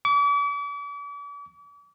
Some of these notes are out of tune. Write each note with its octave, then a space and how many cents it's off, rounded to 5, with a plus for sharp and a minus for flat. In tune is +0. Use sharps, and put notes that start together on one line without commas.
D6 -40